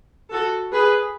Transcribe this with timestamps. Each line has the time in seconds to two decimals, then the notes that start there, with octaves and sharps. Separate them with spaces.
0.31 F#4 A4
0.72 G#4 B4